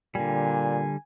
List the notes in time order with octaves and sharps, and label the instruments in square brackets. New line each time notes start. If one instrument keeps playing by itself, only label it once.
[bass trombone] A#2 [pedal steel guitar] D3 G3 [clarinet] G#5